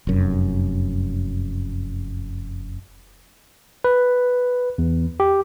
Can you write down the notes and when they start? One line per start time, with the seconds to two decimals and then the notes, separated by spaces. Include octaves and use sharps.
0.07 F1 F#2
3.84 B4
4.78 E2
5.20 G4